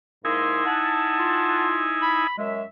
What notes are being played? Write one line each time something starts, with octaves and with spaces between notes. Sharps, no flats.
G#2 A#3 D#4 E4 G#5 C6
F#5 A5
F4
B5
F#2 G#3 E5